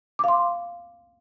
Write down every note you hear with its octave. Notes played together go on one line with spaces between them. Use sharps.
F5 C6 D6